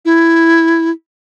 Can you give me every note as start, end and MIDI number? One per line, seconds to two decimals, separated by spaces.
0.05 0.90 64